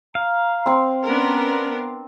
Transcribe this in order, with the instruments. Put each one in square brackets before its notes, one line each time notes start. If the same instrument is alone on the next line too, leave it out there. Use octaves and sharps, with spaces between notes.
[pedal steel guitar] F5 [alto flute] A#5
[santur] C4 C6
[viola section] B3 D4 A#4 [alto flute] C#4